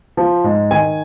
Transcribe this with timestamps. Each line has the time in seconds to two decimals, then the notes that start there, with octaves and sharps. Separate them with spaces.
0.17 F3
0.44 G#2
0.71 D#3 G#5